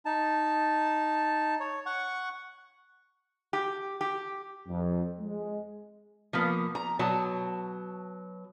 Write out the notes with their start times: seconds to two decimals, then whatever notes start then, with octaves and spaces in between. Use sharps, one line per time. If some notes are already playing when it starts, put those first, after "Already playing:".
0.06 D#4 A5
1.60 C#5
1.86 F#5 C#6
3.53 G4
4.01 G4
4.68 F2
5.20 G#3
6.33 F3 A#3 B3
6.75 A#5
6.99 B2 F#3 A5